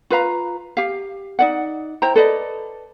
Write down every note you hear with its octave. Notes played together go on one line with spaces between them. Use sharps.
F4 B4 F5 A#5
G4 F5
D#4 D5 F#5
E4 C5 G5 A#5
A4 B4 D5 D#5